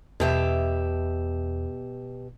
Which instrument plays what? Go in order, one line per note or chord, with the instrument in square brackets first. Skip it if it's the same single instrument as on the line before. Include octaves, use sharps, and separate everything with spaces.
[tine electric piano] E2 [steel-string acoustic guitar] B2 G4 E5